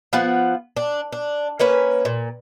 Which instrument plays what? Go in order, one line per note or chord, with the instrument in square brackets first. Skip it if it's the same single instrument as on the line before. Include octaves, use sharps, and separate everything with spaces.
[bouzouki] F3 B3 F4 F#5
D4
D4
A#3 C#4 B4 C#5
A#2